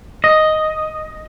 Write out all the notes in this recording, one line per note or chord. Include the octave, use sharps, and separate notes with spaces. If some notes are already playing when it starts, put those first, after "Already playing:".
D#5